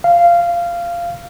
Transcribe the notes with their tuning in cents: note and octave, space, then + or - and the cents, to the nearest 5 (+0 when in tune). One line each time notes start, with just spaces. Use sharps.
F5 -15